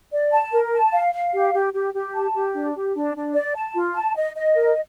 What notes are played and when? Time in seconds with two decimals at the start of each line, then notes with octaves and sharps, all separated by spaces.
0.12 D5
0.32 A5
0.52 A#4
0.73 A5
0.93 F5
1.13 F5
1.34 G4
1.54 G4
1.74 G4
1.94 G4
2.14 A5
2.35 G4
2.54 D4
2.74 G4
2.94 D4
3.15 D4
3.35 D5
3.55 A5
3.75 F4
3.95 A5
4.15 D#5
4.35 D#5
4.55 A#4